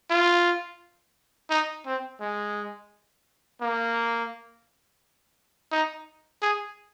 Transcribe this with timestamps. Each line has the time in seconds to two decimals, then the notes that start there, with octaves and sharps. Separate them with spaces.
0.10 F4
1.50 D#4
1.86 C4
2.21 G#3
3.61 A#3
5.72 D#4
6.42 G#4